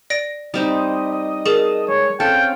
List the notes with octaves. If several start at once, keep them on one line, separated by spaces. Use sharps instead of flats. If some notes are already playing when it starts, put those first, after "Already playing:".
D5 A#6 D7
G3 C4 D#4 D#5
D#5
G#4 A#4 A5
G#3 C#5
C4 C#4 A4 F5 G5